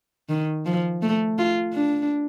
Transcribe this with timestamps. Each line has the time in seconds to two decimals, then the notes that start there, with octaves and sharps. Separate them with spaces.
0.29 D#3
0.66 F3
1.02 A3
1.38 F4
1.74 D4